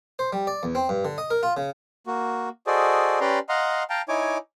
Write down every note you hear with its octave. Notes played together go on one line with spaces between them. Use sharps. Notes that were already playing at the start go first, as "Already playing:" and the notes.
C5
G3
D5
E2
C4
G2
D3
D#5
A#4
F4
C#3
A#3 F#4
F#4 G#4 A4 C5 D5 D#5
C#4 G4 B4 D5 A#5 C6
D#5 F5 F#5 A#5 C6
F5 G5 A5 A#5
D#4 E4 C#5 G#5 D6